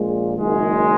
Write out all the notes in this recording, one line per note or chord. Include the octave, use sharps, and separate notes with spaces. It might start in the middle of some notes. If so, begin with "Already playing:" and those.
Already playing: A#1 A#2 G#3
F#1 F#2 D#3 G#3